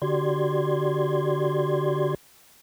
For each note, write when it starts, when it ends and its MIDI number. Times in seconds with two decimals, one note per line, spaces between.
0.02 2.15 50
0.02 2.15 66
0.02 2.15 67
0.02 2.15 74
0.02 2.15 84
0.02 2.15 92